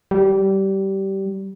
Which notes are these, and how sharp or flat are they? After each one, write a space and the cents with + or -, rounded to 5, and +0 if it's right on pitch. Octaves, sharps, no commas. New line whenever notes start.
G3 -20